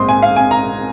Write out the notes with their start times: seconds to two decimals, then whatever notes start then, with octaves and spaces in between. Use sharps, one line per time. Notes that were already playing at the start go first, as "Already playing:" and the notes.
Already playing: A#1 G#2 G#3 C4 C6 D#6
0.09 G#5
0.22 F5
0.36 G#5
0.51 A#5